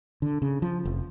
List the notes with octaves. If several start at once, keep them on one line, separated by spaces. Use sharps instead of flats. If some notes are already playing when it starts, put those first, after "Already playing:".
D3
C#3
F3
F1